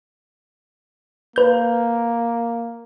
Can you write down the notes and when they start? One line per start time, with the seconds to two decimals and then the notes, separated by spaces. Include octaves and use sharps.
1.36 A#3 B4 G6